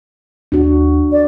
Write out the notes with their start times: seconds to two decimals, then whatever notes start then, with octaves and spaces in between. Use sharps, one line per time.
0.52 D#2 D4 F#4
1.12 D5